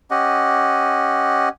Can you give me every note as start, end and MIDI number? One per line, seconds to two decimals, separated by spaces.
0.11 1.49 61
0.11 1.49 67
0.11 1.49 75
0.11 1.49 78